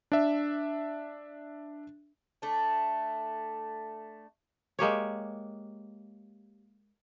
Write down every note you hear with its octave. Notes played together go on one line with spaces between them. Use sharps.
D4 E5
A3 D4
G#3 A#3 G4 C#5